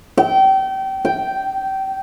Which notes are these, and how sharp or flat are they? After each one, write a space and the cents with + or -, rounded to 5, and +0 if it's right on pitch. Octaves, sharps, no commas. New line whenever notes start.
G5 -30
G5 -5